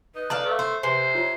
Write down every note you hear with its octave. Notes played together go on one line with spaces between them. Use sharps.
D#4 B4
A4 D5 F5 A#5
A3
C5
C3 B4 C5 G#5 C6
F4 C#5